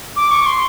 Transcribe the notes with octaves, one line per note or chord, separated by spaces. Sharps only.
D6
C#6
C6